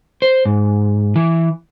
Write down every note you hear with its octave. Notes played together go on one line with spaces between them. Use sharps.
C5
G#2
E3